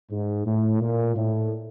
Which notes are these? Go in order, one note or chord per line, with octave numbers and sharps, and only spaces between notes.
G#2
A2
A#2
A2